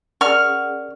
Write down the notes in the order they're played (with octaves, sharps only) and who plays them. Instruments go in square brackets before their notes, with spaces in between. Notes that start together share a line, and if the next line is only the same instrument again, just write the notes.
[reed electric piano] C#4 G#4 [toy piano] A#4 D5 G#5 [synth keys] F#5 [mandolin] C#6 F6